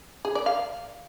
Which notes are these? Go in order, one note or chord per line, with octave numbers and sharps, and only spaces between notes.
G#4
D5
F5